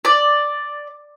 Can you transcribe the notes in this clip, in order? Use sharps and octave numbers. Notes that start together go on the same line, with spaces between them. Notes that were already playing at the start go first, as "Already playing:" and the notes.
D5